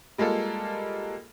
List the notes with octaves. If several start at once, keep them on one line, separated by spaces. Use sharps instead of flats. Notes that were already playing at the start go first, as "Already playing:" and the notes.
G3 G#3 A#3 F4 A4